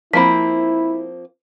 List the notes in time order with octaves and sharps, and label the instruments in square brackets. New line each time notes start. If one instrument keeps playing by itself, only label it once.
[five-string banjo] F3 A#3 C4 [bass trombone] E4 [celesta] B5 B6